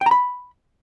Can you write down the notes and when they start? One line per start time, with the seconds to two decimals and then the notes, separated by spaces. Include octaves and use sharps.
0.01 G5
0.06 A#5
0.11 B5